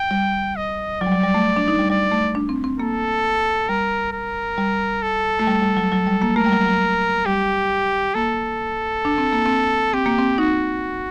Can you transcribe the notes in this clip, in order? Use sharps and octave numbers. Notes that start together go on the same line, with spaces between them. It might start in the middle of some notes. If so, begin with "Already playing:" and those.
Already playing: G5
G3
D#5
F#3 D5
G3
F#3
G3
A3
D4
D#4
G3
G3 D5
A3
D4
C4
C4
A#3 A4
G3 A#4
A#4
G3
A4
A3
G3
G3
F#3
F#3
G3
A#3
A3 A#4
G3
F#3
F#3
G3 G4
A#3 A4
D4
C4
A#3
C4
C4 G4
A#3
C4
D#4 F#4